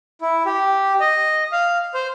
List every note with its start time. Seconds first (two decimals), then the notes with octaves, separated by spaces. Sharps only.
0.21 E4
0.46 G4
1.00 D#5
1.52 F5
1.94 C5